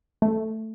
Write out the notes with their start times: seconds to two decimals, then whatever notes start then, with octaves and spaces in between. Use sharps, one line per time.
0.22 A3